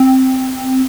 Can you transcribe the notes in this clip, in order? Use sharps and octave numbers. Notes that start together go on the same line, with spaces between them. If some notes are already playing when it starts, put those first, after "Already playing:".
Already playing: C4